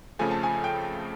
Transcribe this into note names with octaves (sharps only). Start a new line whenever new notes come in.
F2 C#3 F3 A3 G#5
A5
G#5
G5